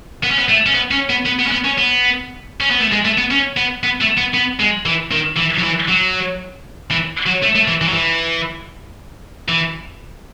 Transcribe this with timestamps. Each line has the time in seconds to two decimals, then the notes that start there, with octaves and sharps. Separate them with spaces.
0.23 B3
0.31 C#4
0.39 B3
0.48 A3
0.66 C#4
0.74 B3
0.91 C#4
1.09 B3
1.25 B3
1.39 B3
1.47 C#4
1.51 B3
1.64 C#4
1.78 B3
2.61 C#4
2.71 B3
2.81 A3
2.92 G#3
3.05 A3
3.18 B3
3.31 C#4
3.57 B3
3.83 B3
4.01 A3
4.17 B3
4.34 B3
4.59 G#3
4.85 E3
5.11 D#3
5.36 E3
5.58 F#3
5.63 E3
5.88 F#3
6.91 E3
7.26 F#3
7.42 A3
7.55 A3
7.68 E3
7.81 E3
7.88 F#3
7.94 E3
9.48 E3